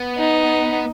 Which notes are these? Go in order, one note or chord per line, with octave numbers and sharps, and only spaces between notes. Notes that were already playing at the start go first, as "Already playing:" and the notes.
Already playing: B3
D#4